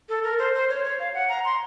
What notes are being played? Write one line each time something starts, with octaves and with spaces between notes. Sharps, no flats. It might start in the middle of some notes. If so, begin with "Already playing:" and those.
A4
A#4
C5
C5
C#5
C#5
F5
F#5
A#5
C6